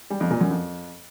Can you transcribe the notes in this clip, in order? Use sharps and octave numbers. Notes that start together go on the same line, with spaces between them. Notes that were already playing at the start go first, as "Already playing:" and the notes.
G3
F2
A#2
F#2
F2